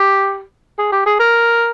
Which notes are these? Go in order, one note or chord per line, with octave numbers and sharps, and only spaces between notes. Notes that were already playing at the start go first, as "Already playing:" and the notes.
Already playing: G4
G#4
G4
G#4
A#4